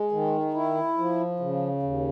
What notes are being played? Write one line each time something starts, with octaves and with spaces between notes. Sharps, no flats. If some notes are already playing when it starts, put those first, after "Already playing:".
Already playing: G#3
D#3
E4
F3
C#3
D#2